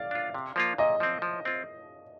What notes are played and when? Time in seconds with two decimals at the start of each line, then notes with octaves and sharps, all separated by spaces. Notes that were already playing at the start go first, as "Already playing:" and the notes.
Already playing: D5 F5
0.11 D4 F4
0.34 C3
0.56 F3 A#3 F4
0.78 A#2 D#5
1.00 F3 C4
1.22 F3
1.45 C4 F4